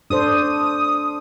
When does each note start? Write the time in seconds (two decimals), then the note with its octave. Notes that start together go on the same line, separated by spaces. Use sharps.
0.10 D4 A4 C5 D#6